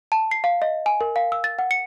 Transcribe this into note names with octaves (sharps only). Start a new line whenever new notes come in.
A5
C7
F5
D#5
G#5
A#4
F5
E6
A6
F#5
C#7